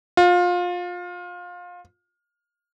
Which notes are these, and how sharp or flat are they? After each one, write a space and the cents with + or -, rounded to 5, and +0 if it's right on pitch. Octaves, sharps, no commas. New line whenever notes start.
F4 +25